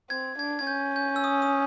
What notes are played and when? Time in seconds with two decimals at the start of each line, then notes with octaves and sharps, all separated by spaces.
0.10 C4 G#6
0.38 D4 G#6
0.59 G#6
0.67 C#4 G6
0.96 G6
1.16 E6
1.24 D#6
1.42 D#6